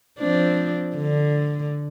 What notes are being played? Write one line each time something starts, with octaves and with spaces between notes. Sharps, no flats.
F3 C4 D4
D3